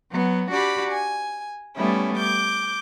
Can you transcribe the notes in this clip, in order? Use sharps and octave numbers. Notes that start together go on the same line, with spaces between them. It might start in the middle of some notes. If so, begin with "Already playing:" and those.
F#3 B3
D4 F#4 G4 D5 B5
G#5
G3 A3 B3 C#4 E4
D6 G6